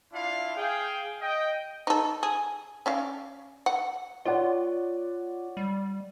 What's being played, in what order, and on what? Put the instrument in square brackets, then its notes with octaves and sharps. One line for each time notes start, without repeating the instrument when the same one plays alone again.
[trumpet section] D4 E4 F4 F5
G#4 F5 G5
D#5 G5
[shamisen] D#4 A4
G#4
C#4 D5 F5
F#5
[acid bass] F4 [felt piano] C#5 D5 F#5
[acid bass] G3